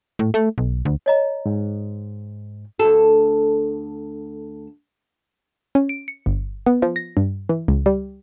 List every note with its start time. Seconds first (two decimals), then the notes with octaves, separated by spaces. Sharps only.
0.19 A2
0.34 A3
0.58 B1
0.85 D2
1.06 C#5 D#5 A#5
1.46 G#2
2.80 D2 A4
5.75 C#4
5.89 D7
6.08 C#7
6.26 G1
6.66 B3
6.82 F3
6.96 A#6
7.17 G2
7.49 E3
7.68 C#2
7.86 G3